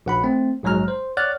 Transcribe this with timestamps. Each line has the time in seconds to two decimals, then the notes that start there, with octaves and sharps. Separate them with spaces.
0.06 A#1 F#5 B5
0.24 A3 C4
0.63 A#1 G#2 F#3 G#3 A#5 F6
0.88 C5
1.17 C#5 D5 F#5 F6 F#6 A6